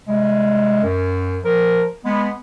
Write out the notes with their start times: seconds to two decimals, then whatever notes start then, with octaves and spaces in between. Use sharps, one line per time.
0.06 C3 G3 G#3
0.83 F#2
1.44 F3 A#4
2.04 G#3 B3